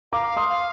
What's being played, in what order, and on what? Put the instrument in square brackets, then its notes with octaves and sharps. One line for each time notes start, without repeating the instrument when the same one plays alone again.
[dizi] F5 [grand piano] A#5 D6
[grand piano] C6 D#6
[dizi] F5